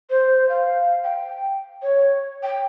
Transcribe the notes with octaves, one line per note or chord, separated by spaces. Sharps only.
C5
F5
G5
C#5
G5